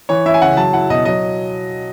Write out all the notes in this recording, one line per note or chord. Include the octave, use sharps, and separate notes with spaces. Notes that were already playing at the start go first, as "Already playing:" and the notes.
E3 C#5
E4 E5
G#5
C#3 F#5
F#3 A5
E4 F#5
B2 D#5
F#3 D#5